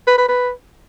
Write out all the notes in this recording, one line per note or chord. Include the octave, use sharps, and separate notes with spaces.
B4
B4
B4